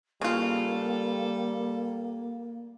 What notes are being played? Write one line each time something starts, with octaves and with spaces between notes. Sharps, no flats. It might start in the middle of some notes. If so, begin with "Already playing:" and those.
C#3 G3 A#3 F4 A4